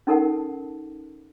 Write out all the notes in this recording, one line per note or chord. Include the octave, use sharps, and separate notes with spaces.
C#4 D#4 A4 A#4 F#5 A5